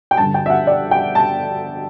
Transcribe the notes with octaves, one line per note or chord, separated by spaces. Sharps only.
G5
G2 D3 A5
G5
E5
F#5
D5
G5
A5